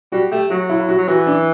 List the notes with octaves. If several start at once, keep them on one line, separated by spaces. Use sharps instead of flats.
G3 F#4
A3 G4
F#3 F#4
E4
E4
F#4
F#3
E3 F#4
D4